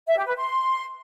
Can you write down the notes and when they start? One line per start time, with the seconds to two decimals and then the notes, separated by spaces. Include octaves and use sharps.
0.07 E5
0.17 G4
0.27 B4
0.36 C6